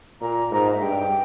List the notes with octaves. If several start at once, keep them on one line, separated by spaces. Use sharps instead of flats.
A#2 A#5
G#2 A#5
D#5
E5
G2 G5